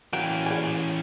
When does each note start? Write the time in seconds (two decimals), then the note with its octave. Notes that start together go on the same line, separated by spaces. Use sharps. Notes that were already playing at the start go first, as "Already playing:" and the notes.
0.13 E3 F#3 A#3 C#4 F#4 G5
0.46 A#2 C#3 E4 G#5